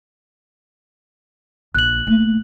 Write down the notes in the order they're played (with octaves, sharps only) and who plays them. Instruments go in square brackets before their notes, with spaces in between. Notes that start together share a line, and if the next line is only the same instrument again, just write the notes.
[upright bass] A#1 [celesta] F#6 F#7
[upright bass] A3 A#3